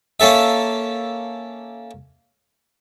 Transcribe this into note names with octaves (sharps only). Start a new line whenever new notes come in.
A#3 C#4 A4 E5